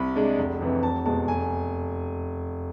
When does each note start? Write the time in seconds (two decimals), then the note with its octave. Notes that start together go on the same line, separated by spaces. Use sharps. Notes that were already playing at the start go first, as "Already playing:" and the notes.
Already playing: C2 B5
0.15 C3 G#3 D4
0.38 F1
0.61 F2 C3 E3
0.83 F1 A5
1.06 E2 B2 G#3 A5
1.28 F1 G#5